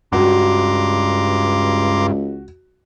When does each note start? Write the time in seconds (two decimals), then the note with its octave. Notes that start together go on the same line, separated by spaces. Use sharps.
0.12 C#2 G2 F#4 A#5 C6 D6